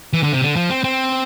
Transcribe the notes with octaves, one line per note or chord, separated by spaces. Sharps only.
E3
D3
C3
D3
F3
C4
C4